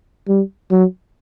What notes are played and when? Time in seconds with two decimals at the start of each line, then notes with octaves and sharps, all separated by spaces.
0.28 G3
0.71 F#3